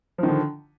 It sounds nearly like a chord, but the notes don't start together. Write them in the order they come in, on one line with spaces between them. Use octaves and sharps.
F3 D#3 D3